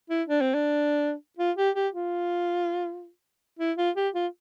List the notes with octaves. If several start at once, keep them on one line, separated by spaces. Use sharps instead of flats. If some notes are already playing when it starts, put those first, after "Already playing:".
E4
D4
C4
D4
F4
G4
G4
F4
E4
F4
G4
F4